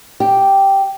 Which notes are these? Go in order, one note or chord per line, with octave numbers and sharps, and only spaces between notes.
G4